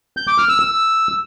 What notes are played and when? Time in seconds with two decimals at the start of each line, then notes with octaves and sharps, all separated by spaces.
0.17 G6
0.28 D6
0.38 F6
0.49 E6
0.60 E6